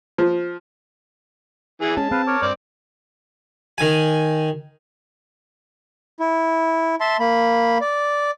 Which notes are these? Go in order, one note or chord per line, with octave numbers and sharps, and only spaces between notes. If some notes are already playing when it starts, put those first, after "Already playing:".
F3
E3 G#4
G#3 C#4 G#4 A5
C4 B4 F5
A#4 C#5 D6
G2 C4 D5
D#3 G#5
E4
E5 A5 C6
A#3 B5
D5